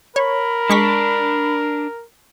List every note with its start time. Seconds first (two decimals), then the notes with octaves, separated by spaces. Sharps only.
0.16 A#4 C#5 B5
0.70 G#3 D4 C#6 B6